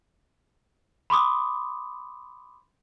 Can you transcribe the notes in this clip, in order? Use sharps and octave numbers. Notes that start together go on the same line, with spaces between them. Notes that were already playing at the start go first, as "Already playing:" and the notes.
B5 C6 D6 D#6